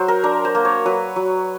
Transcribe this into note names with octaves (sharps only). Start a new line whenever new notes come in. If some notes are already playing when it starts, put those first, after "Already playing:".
Already playing: F#3 C5 F#5
A#4
D4 A#4
C5
A#3
C#5
F#3 B4
F#3